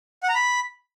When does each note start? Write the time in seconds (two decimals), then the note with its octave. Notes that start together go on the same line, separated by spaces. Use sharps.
0.23 F#5
0.29 A#5
0.35 B5